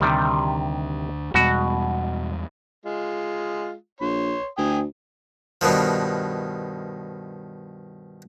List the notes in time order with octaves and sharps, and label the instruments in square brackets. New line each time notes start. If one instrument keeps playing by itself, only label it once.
[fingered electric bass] D2 [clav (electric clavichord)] C3 D#3 G3
[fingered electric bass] E2 G3 G#3 [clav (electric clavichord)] B2 F#4
[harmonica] G#3 F4
[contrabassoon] A#1 [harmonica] C#5 C6
[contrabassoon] D2 [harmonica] G5 G#5 D#6
[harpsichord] G2 B2 D#3 F3